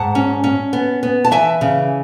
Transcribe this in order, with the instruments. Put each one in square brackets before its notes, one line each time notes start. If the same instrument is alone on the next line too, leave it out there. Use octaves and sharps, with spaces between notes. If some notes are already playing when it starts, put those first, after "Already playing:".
Already playing: [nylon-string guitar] G#2 F#5 A5
C#4
C#4
B3
B3
A5
E3 E5 G#5
C#3